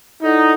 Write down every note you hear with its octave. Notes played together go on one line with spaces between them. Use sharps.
D#4 E4 A4 D5 F#5